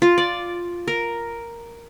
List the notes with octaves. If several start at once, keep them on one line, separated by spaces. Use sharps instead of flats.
F4
D5
A#4